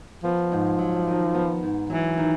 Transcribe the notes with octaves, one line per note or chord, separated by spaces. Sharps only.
F3 B3
G#2
F#3
D#3
B3
G#2
E3 F#3
D#3